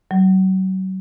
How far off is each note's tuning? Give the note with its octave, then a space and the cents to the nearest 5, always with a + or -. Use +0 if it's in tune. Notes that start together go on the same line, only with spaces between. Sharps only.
F#3 +35